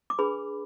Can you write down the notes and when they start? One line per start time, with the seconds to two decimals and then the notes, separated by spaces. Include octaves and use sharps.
0.10 D6
0.19 D4 G#4 B4 B5